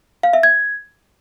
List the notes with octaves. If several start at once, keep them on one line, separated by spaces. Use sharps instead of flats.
F5
E5
G#6